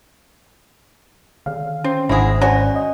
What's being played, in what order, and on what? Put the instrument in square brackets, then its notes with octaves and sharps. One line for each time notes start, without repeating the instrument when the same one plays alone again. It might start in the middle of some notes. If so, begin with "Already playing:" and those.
[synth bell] D3 D#3 [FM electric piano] F5
[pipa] C4 [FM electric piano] C#4
[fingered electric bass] G#1 [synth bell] D4 C5 F#5 [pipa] E4 G#4 [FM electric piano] A#6
[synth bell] C#4 D5 [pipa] F#4 C#5 G#5
[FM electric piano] D#5